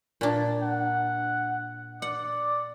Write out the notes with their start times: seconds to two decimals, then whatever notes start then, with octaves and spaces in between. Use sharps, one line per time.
0.21 A#2 D4
0.62 F#5
2.02 D5 F#5